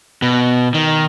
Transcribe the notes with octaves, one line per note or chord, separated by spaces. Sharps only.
B2
D#3